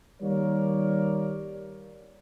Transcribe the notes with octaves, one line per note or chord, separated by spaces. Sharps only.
D#3 G3 A#3 A#4 C#5 D5